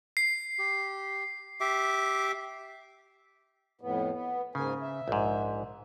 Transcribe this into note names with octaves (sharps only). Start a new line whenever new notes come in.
C7
G4
G4 E5 D6
F2 A2 B3
B3
G#2 C#3 A#3 G#5
E5
A#1 G#2